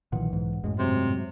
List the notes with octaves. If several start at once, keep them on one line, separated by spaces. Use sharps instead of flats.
B1 A#2 D#3 E3 F#5
G#2
F#2 A2 G#3
G#2 C3 F#3 G#3